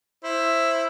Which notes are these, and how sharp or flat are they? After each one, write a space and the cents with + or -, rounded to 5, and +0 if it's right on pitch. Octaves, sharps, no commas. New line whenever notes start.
E4 +5 C5 +15